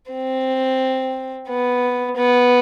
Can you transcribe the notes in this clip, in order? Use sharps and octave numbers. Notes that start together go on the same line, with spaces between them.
C4
B3
B3